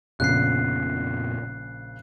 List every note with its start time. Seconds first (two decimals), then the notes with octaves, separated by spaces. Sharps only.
0.20 A#1 F2 A#2 C#3 B3 F#6 C7